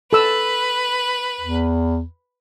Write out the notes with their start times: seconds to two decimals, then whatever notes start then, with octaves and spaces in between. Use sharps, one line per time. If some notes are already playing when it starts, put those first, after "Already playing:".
0.13 A4 B4 E6
1.41 E2